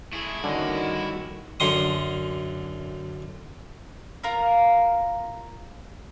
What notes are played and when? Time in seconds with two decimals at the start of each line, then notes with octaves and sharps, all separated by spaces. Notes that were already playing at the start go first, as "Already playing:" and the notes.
0.13 A3 E4 G#4
0.44 D3 D#3 G3 C#4 F#4 D#5
1.60 F#2 D3 C6 D#6
4.23 F4 A#4 F5 A#5